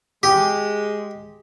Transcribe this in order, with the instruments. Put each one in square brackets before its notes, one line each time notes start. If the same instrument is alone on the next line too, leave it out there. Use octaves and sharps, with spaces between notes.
[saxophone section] G#3 [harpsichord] G4